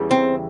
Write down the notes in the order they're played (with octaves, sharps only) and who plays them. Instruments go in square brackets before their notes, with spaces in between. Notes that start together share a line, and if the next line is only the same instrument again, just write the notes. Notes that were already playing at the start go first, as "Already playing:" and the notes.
Already playing: [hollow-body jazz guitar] E2 C#3 E3 G3
C4